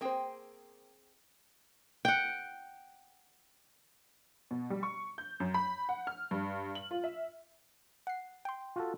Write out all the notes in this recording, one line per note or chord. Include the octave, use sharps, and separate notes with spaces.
A#3 C4 G#4 C5 G5
F#5 G5
B2
G3
C#6
G6
F#2
B5
F#5
F6
G2
F#7
F4
E5
F#5 C7
G5 C6
F4 F#4 A4